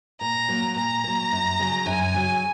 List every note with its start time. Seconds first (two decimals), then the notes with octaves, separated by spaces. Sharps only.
0.20 A#2 A#5
0.48 F#3 A#3
0.76 A#2 A#5
1.04 F#3 A#3
1.32 F#2
1.59 C#3 F#3
1.86 F#2 G#5
2.14 C#3 F#3